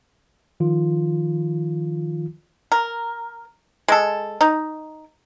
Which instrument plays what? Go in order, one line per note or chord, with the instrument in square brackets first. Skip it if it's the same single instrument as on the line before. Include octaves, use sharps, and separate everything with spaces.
[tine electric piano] D#3 F3 F4
[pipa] A#4
G#3 A4
D#4